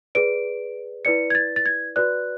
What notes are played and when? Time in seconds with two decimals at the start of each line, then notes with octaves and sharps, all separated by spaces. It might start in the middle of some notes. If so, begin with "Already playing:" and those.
0.15 G#4 B4 D5 D7
1.05 E4 B4 D5 C#7
1.30 G#6
1.35 A6
1.56 A6
1.66 G#6
1.96 F#4 B4 D5 F#6